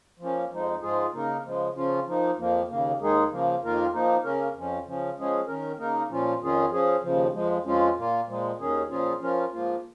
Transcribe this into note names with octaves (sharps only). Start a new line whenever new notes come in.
F3 A#3 C#4
F2 F3 G#3 D#4
G#2 F3 G#3 F4 G#4
C#3 A#3 D#4 A#4
C#3 F3 G#3
C#3 F3 C#4 F4
F3 A#3 D#4
F2 F3 A#3
D#2 C#3 A#3
D#2 D#3 G#3 D#4 G#4
C#3 F3 A#3
F2 D#3 A#3 F4 A#4
F3 A#3 D#4
C#3 A#3 C#4 A#4
F2 F3 C#4
C#3 F3 C#4
F3 G#3 C#4 G#4
D#3 C#4 A#4
C#3 A#3 D#4 A#4
A#2 F3 C#4 F4
F2 D#3 C#4 F4 G#4
F3 C#4 G#4
D#2 C#3 F3
F2 F3 G#3
F2 F3 G#3 C#4 F4
A#2 A#3 F4
A#2 F3 G#3
D#2 D#3 C#4 G#4
A#2 F3 C#4 F4 G#4
F3 C#4 F4 A#4
G#2 F3 A#3 F4